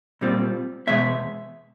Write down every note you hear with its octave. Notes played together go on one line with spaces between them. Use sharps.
A#2 G3 C4 F4
E2 B2 G#3 B3 E5